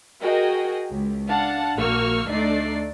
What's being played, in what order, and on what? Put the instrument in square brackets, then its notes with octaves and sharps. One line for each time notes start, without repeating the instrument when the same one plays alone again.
[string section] F#4 G#4 A#4 D#5 G5
C#2
D4 F5 F#5 A5
A#1 A#3 F#4 C#6 E6 F6
D2 A3 D4 D#4 D5 C7